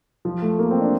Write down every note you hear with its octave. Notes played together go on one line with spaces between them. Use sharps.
F3
A3
A#3
C4
D4